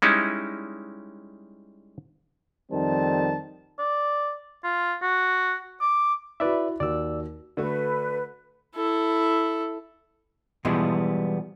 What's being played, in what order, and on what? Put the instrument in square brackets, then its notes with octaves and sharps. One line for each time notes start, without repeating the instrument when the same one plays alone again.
[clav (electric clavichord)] G3 G#3 C#4 D#4 E4
[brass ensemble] F2 D#3 G3 C4 A5
[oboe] D5
F4
F#4
D6
[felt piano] E4 F#4 [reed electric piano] B4 D5 E5
[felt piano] D#2 F#4 [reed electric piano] D5 E6
[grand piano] D3 A3 F#4 [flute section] B4
[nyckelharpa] E4 A4
[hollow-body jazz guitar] B2 E3 F3 G3 G#3 B3